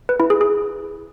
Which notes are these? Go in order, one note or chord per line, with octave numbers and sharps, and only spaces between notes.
B4
E4
G#4
G#4